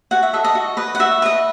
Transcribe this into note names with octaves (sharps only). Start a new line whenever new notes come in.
F#4 F#5
E5
A4 D#5 E5
D#5
F#4
B4 D#5
F#5
F#4 E5
B4 D#5